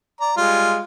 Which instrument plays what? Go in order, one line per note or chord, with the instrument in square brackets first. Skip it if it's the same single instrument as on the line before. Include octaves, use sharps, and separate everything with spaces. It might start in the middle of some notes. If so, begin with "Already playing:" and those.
[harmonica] D5 A#5
G3 G#3 F4